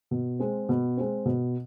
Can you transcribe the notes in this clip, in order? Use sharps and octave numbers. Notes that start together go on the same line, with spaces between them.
B2
G#3 C4
B2
G#3 C4
B2